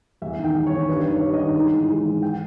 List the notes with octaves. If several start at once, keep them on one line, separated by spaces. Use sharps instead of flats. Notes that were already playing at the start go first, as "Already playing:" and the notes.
E2 E5
D#3
G5
E2
C#5
D#3
G2 B4
D#3
C#5
G2 C#5
D#5
D#3
G#2
E3
G#2
E3
G5